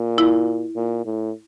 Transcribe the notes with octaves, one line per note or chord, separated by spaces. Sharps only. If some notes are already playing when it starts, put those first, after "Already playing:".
Already playing: A#2
E4
A#2
A2